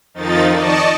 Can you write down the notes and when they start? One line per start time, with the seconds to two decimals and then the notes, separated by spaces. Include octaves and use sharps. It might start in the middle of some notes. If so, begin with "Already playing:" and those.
0.14 F2 D#3 F3 D#4 A6
0.51 D5 D#5 A5 C#6